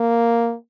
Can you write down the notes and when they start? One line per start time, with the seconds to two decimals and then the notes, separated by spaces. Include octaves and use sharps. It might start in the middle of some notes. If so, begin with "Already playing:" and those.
Already playing: A#3